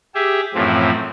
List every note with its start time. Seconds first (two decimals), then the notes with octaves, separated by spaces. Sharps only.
0.15 G4 G#4 E5
0.54 F#2 A2 E3 F3 C4